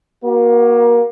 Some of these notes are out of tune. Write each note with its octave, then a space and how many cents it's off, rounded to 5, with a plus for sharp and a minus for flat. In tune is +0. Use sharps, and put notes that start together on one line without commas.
A#3 +25 F#4 +0